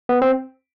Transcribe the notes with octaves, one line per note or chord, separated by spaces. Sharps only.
B3
C4